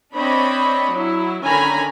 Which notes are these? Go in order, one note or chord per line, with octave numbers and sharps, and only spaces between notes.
C4 D4 C#5 D#5 B5
F#3 E4
D3 D#3 C#4 G#5 A#5 B5